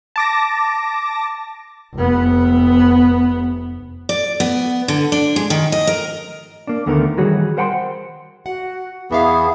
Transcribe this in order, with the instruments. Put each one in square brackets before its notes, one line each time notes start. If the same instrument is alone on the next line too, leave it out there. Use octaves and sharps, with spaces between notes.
[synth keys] A5 D6 A#6
[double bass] F1 B3
[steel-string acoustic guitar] D5
B3
D3
D4
G#3
D#3
D#5
A#4
[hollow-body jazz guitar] A#3 D4
D2 D3 D#3 A3 B3 A#4
D#3 E3 G3 F#4 G#4 C#5
A#4 C5 F#5 G5 A#5 C6
[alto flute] F#4 [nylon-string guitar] F#5
[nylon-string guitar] E2 E5 F5 [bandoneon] E3 B3 [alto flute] G#4